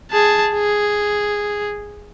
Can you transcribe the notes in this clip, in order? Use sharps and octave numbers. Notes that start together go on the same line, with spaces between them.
G#4 A5
G#4